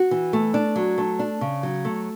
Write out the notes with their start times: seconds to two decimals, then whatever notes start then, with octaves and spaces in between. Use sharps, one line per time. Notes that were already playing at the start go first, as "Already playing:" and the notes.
Already playing: F#4
0.11 E3
0.33 A3
0.54 D4
0.76 F#3
0.98 A3
1.19 D4
1.41 C#3
1.63 F#3
1.85 A3